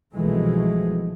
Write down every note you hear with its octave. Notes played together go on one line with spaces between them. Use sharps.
C2 B2 E3 F3 G#3 A3